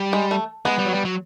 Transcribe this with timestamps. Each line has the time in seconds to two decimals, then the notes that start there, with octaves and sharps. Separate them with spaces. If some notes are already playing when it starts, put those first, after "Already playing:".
Already playing: G3
0.13 G#3
0.31 A3
0.65 G#3 B3
0.78 G3
0.85 F#3
0.92 G3
1.05 F#3